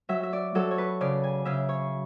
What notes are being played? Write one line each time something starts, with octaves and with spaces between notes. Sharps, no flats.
F#3 E5
E5
D5
F#3 A4
C#5
B4
C#3 D5
G#5
C#3 E5
C#5